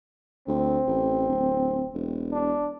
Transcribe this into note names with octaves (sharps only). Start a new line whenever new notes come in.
D2 C4
A1
D1
E1
D4